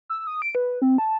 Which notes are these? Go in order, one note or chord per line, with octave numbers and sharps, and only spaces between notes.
E6
D#6
D7
B4
C4
A5